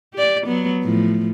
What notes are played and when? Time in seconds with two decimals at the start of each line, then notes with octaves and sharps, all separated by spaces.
0.14 G4 D5
0.47 F#3 B3
0.83 A2 F3